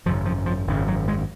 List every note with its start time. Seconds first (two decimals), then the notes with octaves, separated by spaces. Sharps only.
0.06 G#1 F#2 C#3 F3
0.26 F3
0.46 F3
0.67 G#1 F#2 C#3
0.88 F#3
1.08 G#3